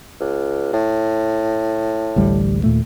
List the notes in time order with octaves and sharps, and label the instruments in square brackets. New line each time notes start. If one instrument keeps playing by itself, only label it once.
[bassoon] C#2
A2
[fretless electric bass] A1 D2 G3
D#2 A#2 A3